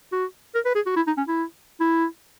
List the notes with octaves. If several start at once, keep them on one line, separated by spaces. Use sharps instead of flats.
F#4
A#4
B4
G#4
F#4
E4
D#4
C#4
E4
E4